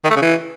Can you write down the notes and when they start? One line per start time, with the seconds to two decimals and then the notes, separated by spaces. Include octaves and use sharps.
0.04 D#3
0.10 A3
0.16 C#3
0.22 E3